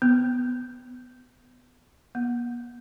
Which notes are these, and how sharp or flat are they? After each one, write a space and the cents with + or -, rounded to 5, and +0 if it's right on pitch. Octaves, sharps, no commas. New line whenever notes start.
B3 +10
B3 -45